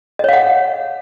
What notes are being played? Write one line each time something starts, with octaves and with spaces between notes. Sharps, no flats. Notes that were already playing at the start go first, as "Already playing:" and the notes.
C#5 D#5 F5 F#5